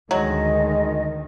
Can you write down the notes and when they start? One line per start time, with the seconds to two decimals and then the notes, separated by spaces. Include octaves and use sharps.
0.11 D2 D3 D#3 F#3 G#3 D#5